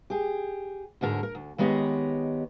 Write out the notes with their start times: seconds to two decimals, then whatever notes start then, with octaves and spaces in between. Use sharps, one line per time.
0.10 G4 G#4
1.01 D2 G#2 D3 A#4
1.23 A#4
1.35 D2
1.58 D#3 G#3 B3 G4 C#5 D#5